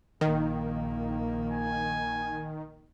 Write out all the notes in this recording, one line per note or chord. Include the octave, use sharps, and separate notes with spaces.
A#1 D#3 A#3
G#5